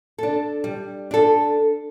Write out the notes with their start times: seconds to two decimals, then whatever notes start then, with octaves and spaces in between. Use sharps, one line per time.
0.18 D4 A4
0.64 G3
1.11 D4 A4